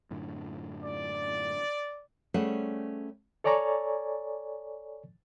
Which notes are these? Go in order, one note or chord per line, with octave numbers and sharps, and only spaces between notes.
F#2 A2 D3
D5
G3 A3 C#4 G#4 C5 F#5
A4 C#5 D5 G#5 A#5 C#6